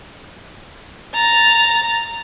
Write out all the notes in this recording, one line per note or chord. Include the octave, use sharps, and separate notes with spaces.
A#5 A6